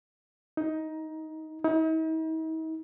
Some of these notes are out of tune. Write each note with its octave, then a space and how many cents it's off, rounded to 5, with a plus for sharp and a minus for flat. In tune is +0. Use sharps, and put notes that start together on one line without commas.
D#4 +15
D#4 +45